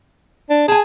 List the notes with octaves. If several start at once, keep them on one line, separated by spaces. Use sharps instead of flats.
D4
G#4 G#5 A5